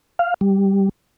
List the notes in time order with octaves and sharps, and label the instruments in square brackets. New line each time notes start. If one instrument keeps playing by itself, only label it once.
[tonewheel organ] F5
G3